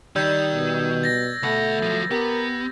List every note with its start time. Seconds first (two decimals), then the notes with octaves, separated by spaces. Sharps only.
0.16 D#3 G3 E6 G6 G#6
0.53 B2
1.03 A6 A#6
1.43 D2 B2 A3 F#5
1.83 F3 F#3
2.11 B3 G4 A#4